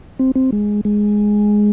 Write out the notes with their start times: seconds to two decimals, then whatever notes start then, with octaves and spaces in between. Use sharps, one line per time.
0.19 C4
0.35 C4
0.52 G#3
0.85 G#3